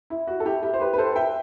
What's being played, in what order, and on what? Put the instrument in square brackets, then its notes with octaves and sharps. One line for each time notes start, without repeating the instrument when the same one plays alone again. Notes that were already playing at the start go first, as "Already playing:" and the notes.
[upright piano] E4
F#4
A4
E4 G4
E4 G4
C5
G4 B4
B4
A4 C5
E5 G5